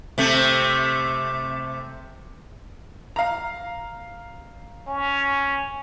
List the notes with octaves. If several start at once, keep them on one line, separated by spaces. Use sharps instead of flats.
C3 A3
F5 A#5
C#4